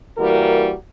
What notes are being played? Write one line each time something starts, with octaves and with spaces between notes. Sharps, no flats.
E3 G3 A#3 F#4 A#4